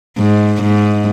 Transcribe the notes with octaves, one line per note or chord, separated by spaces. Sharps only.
G#2
G#2